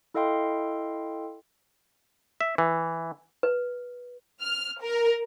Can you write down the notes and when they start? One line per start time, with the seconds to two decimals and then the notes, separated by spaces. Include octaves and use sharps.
0.14 E4 A4 D#5 F5 G5 C6
2.41 E5
2.58 E3
3.43 B4
4.41 F6
4.82 A#4